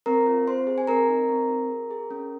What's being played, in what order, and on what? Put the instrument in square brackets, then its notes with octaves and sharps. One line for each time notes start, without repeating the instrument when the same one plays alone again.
[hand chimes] C4 A#4 A#5
F4
C4 C5 C6
G#4
G#5
C4 A#4 A#5
D#4
C4
F#4
G#4
G#4
C#4